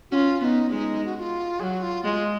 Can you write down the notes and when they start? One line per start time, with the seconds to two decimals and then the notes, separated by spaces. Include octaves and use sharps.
0.11 C#4 F4 F#4
0.41 B3 D#4 F4
0.70 G#3 D#4
1.05 F#4
1.16 F#4
1.19 F4
1.60 F#3 G#4
1.64 F#4
1.83 F4
2.04 G#3 F4